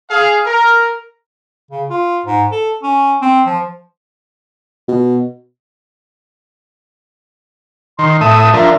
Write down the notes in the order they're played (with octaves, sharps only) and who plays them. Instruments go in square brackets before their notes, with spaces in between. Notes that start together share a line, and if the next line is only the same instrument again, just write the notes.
[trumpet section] G#4 F5
A#4
[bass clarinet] C#3
F4
G#2
A4
C#4
C4
F3
[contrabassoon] B2
[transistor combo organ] D#3 [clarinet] C6
[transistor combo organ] A2 E5 D#6 [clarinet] A5
[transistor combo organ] F3 D4 A#4 [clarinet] E5